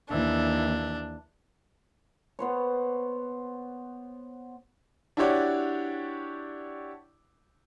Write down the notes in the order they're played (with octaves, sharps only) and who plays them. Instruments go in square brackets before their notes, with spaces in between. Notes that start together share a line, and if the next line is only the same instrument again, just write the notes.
[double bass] D#2 E3 [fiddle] D4
[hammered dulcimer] B3 C5 C#5
[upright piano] D4 E4 F#4 G4 C#5 D5